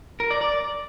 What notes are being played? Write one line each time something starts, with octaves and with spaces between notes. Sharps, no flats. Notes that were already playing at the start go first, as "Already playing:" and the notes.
A#4
D5
D5